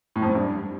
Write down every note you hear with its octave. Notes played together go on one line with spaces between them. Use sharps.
A2
F2
G#2
G2